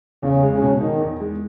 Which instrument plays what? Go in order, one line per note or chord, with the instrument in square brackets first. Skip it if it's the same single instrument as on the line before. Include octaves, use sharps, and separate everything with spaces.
[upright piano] E2 [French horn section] C#3
[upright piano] G#3
[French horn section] C#3
[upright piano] B2
[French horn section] D#3 [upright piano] D#4
[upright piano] E2
G#3